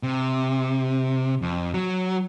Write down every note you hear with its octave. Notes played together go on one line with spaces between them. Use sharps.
C3
F2
F#3